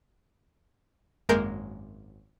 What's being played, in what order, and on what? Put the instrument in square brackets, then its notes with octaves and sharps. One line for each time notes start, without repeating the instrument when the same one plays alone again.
[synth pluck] G#1 F#2 G#3 A#3 A#4 G6